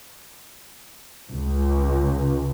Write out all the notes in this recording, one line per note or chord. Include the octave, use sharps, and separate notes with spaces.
C#2